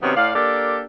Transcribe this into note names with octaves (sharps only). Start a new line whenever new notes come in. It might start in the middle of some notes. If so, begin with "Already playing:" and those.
C3 D#3 F#3 B3 C#4
A2 D5 F5
A#3 D4 G4 A4 A#4